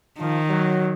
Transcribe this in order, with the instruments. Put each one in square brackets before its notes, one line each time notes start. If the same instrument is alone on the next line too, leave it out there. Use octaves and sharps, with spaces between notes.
[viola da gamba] D#3 [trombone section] F3
[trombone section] F#3